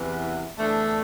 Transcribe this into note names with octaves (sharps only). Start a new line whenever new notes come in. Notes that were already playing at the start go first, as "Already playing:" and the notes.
Already playing: E2 C3 E3 B3 E4
E2 D3 A3 D4